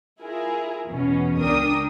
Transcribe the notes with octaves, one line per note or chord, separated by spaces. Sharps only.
E4 F4 G#4 A#4
E2 B2 C#4
C#2 D4 A#4 G5 D#6